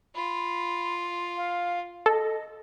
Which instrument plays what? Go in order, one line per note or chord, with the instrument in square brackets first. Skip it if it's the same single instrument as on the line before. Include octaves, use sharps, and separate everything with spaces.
[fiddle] F4 [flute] B5
[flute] F5
[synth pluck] A4 [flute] D#5